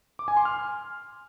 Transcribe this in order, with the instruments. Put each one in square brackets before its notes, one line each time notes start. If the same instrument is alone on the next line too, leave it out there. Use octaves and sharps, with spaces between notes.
[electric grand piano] D6
G#5
C6
F6